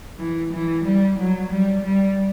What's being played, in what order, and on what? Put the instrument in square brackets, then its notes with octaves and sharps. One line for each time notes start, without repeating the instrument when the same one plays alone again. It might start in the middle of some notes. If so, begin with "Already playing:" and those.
[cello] E3
E3
G3
F#3
G3
G3